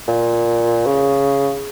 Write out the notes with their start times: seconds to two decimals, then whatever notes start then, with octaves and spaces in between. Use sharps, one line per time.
0.08 A#2
0.86 C#3